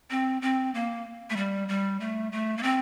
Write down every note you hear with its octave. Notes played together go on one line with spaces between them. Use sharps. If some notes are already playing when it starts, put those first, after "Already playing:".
C4
C4
A#3
A3
G3
G3
A3
A3
A#3
C4